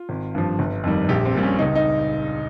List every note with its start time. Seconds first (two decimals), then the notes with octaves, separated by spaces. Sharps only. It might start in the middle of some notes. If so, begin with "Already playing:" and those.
Already playing: F4
0.09 G#1
0.35 G2 F3
0.59 G1
0.84 F2 D#3 G3
1.09 A#1 G4
1.25 C4
1.35 A#2 G3
1.43 C#4
1.59 C#2 D#4
1.75 D#4